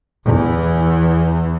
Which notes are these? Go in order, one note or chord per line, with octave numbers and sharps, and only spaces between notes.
E2 E3